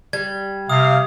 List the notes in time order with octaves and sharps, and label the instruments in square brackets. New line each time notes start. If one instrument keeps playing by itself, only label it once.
[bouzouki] G3 [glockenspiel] G#6
[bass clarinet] C3 [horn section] F5 [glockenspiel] D#6